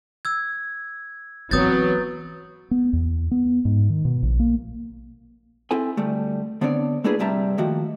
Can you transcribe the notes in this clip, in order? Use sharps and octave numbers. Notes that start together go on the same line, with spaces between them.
E6 G#6
E3 F#3 B3 C4 D#6 G6 A6
B3
E2
B3
G#2
D#3
B2
A#1
A#3
C4 E4 A4 G#5
D2 G3 A3
D3 B3 C4 D4 C#5 D5
A3 A#3 D4 E4 G#4 B4
G2 C3 G3 E5 A5 A#5
D#3 F3 A3 A#3 F#4 G4